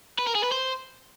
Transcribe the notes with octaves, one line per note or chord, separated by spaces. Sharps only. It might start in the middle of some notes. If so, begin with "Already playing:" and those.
B4
A#4
G#4
B4
C5